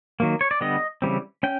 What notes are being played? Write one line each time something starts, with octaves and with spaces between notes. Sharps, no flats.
D#3 F#3 A#3
C#5
D5
D3 G3 B3 D#5
C#3 E3 G3 C4
C#4 G5